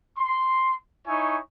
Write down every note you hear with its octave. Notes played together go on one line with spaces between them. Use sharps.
C6
D#4 E4 C#5 G#5 C#6